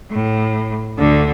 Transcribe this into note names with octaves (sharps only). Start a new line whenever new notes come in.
A2
D2 D3